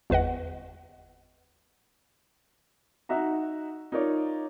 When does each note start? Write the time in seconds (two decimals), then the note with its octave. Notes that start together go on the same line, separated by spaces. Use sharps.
0.10 G1 E2 B4 D#5 F#5
3.09 D#4 F#4 E5 A#5
3.92 D#4 F4 A#4 C#5 D5